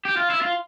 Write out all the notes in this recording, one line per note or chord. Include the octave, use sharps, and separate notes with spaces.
G4
F4
E4
F4